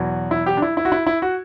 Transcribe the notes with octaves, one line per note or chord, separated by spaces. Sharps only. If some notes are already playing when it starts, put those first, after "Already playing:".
Already playing: E2 B2 F#3
E4
G4
D4
E4
E4
F#4
E4
E4
F#4